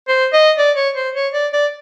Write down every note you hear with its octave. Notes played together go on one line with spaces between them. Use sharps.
C5
D#5
D5
C#5
C5
C#5
D5
D5